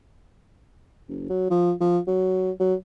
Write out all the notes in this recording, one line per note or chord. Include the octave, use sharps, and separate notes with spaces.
F#1
F#3
F3
F3
F#3
F#3